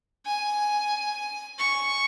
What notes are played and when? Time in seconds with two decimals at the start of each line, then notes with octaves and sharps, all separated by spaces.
0.26 G#5
1.58 C#6